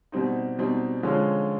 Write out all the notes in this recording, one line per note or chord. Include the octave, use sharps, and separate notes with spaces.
B2 G3 C4 D#4
B2 G3 C4 D#4
D3 F3 G#3 C#4 F4